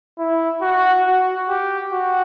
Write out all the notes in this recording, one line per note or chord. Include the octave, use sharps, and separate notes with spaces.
E4
F#4
F#4
G4
F#4